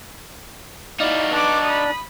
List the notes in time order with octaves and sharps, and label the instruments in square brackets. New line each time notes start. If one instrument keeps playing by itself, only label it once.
[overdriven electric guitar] D#4 F#4 [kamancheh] E4 [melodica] D5 F5
[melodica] D4 D5 [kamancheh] B4 D6
[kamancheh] B5 D#6